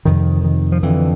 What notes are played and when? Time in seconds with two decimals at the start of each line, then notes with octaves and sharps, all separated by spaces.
0.05 F2 C3 D#3
0.44 D#3
0.72 F3
0.83 F2 D3 E3